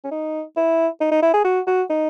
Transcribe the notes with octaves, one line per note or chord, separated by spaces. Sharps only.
C#4
D#4
E4
D#4
D#4
E4
G#4
F#4
F#4
D#4